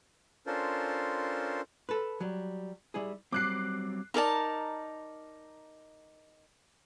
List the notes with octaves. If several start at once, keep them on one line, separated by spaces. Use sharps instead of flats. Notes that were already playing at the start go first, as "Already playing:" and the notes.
C#4 D4 F4 A4 A#4 C5
A4 B4
F#3 G3
G3 E4 G#4
F#3 G3 C4 D6 F#6 C7
D#4 A#4 D5 A5